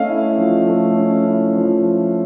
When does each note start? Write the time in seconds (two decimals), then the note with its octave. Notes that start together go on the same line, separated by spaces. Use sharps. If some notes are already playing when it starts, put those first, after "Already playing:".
Already playing: A3 C#4 D#5 F5
0.09 E4
0.38 F3
0.67 A3
0.97 C#4
1.26 E4
1.56 F3